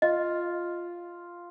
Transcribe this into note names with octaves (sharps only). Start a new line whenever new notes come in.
F4 D#5